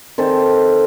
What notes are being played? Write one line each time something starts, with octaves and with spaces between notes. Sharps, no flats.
D#3 C4 A4